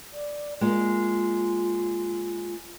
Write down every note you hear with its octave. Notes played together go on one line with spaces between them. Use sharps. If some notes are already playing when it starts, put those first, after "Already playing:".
D5
G#3 A#3 F4